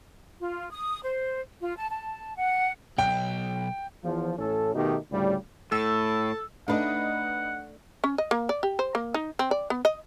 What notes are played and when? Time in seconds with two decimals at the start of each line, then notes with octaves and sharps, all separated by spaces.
0.38 F4
0.71 D#6
1.03 C5
1.61 F4
1.77 A5
1.89 A5
2.36 F#5
2.98 B1 G5
4.04 E2 F3
4.39 A1 A2 C#4 A4
4.75 B2 D#3 A3 D#4 G4
5.12 D2 A2 C#3 G3
5.72 A2 A4 E6
6.68 A3 D4 D#4 B4 D#5 F#5
8.04 C#4
8.18 D#5
8.31 A#3
8.49 D5
8.63 G4
8.79 C5
8.95 A#3
9.14 D#4
9.39 C4
9.51 D5
9.70 B3
9.85 D#5